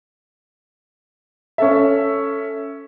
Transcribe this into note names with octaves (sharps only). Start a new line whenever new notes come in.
C#4 A4 E5